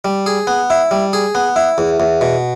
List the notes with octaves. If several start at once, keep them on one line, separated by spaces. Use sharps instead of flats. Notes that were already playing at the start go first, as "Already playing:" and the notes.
G3
G#4
B3
E4
G3
G#4
B3
E4
E2
E2
B2